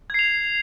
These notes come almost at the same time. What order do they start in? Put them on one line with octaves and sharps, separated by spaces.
G#6 C7 F7